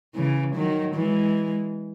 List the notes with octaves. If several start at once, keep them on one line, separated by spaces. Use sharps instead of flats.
C#3 E3
D#3 F#3
E3 G#3